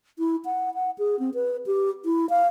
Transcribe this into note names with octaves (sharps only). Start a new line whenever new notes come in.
E4
F#5
F#5
G#4
C4
B4
G4
E4
F5